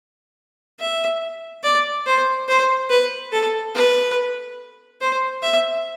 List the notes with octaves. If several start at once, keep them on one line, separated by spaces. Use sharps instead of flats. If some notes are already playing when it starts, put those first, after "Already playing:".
E5
D5
C5
C5
B4
A4
B4
C5
E5